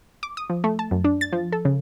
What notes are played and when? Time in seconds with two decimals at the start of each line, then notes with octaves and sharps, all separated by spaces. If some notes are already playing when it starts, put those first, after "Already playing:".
0.23 D6
0.37 D#6
0.50 F3
0.64 A3
0.79 A5
0.91 F#2
1.04 D4
1.21 A6
1.33 F3
1.52 A4
1.65 C#3